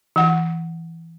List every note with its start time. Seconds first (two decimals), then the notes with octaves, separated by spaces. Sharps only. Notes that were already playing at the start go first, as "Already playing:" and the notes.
0.16 E3 F#5